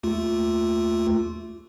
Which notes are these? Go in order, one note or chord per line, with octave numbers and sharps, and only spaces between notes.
D#2 A3 F4